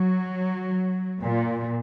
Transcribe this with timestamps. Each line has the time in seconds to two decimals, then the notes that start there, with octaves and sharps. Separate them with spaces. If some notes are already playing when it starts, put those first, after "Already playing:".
Already playing: F#3
1.23 A#2